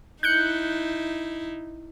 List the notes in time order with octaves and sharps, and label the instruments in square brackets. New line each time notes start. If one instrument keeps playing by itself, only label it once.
[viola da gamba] D#4 E4 [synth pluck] F#6 G6 C#7